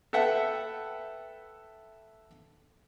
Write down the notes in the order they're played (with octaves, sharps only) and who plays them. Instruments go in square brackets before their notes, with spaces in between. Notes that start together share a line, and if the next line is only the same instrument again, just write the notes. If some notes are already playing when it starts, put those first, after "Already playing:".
[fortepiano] A4 B4 E5 F#5 G5